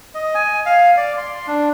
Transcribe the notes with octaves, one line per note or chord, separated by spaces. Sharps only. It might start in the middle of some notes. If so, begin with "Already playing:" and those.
D#5
G#5
F5
D5
C6
D4